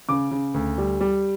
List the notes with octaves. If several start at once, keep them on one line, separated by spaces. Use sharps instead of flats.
C#3 D6
C#3
D2
G3
G3